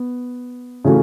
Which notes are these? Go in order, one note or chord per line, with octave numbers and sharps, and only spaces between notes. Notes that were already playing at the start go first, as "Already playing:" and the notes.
Already playing: B3
C#3 E3 A3 C#4 F#4